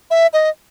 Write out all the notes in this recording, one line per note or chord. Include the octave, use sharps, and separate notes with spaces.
E5
D#5